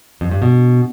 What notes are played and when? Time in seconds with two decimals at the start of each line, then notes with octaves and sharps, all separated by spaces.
0.21 F2
0.31 G2
0.42 B2